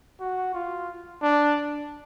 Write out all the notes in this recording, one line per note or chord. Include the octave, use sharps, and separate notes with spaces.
F#4
F4
D4